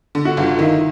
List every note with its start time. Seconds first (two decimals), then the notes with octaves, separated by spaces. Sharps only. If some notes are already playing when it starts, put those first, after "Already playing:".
0.15 D3
0.25 F#4
0.37 G1 F4
0.59 D#3 E4